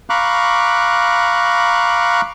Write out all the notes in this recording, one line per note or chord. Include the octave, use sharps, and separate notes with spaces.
F5 A#5 B5 C#6 D6 F#6